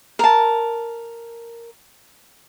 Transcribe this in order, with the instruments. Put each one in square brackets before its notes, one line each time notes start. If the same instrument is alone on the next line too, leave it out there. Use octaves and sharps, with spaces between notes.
[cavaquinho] A#4 A5